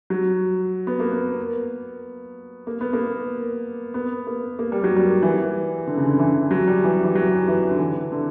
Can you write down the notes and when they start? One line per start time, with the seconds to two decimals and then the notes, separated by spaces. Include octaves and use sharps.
0.10 F#3
0.87 B3
1.00 A#3
1.12 B3
2.67 A#3
2.81 B3
2.93 A#3
3.94 B3
4.27 A#3
4.59 A#3
4.72 G3
4.84 F#3
4.96 G3
5.22 E3
5.87 D3
5.97 C#3
6.07 D3
6.19 E3
6.51 F#3
6.67 G3
6.84 E3
7.04 E3
7.15 F#3
7.48 E3
7.71 D3
7.79 E3
8.12 D3